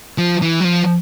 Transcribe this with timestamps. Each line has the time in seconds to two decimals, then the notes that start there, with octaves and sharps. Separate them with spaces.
0.18 F3
0.42 E3
0.60 F#3
0.65 F3